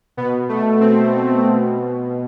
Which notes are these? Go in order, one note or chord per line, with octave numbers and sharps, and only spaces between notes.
B2 B3
A3
C4
B2